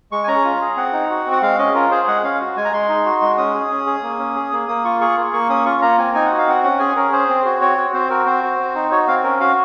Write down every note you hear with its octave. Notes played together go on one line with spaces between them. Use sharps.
G#3 C#6
G#5
C#4 A#5
F4
G#4
C4 F#5
D#4
F#4
C4
F#5
G#3 F5
C#4 D#5
F4 A#4
G#4 C5
G#3 F#5
C#4 F5
F#4
G#3 G#5
A#5
G#3 C6
D#4
F#4
G#3
C#4 D#6
G#4
C#4
G#4
A#3
C#4
G#4
A#3
A#3 D#6
F4 C#6
G#4 C#6
A#3
A#3 C#6
C#4 D#6
F4 C#6
A#3 A#5
C4 G#5
D#4 G#5
F#4 F#5
F5
C4 F#5
C#4 F#5
G#4 G#5
C#4 A#4
G#4 C5
C4
F#4
C4 C#5
F#4
C4 C5
F#4 A#4
C4 C5
F#4
C4
D#4
F#4 C#5
C4 F5
C#4 A#4
F#4 F5